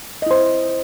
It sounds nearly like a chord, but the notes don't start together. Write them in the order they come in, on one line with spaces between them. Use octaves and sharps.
D#5 E4 C5